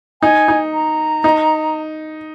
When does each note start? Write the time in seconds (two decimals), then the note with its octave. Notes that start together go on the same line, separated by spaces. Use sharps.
0.22 D#4 G#5
0.48 D#4
0.73 A#5
1.24 D#4